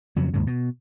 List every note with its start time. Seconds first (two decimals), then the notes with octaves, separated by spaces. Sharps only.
0.16 F2 C#3 F#3
0.34 D#2 G#2 C#3
0.47 B2